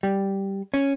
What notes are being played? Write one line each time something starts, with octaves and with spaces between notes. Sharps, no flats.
G3
C#4